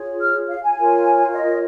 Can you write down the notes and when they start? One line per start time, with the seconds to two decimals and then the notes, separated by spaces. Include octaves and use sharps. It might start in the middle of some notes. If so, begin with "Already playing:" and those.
Already playing: F4 G#4 C#5
0.22 F6
0.49 F5
0.63 G#5
0.77 F4 A#4 C#5
1.33 D#5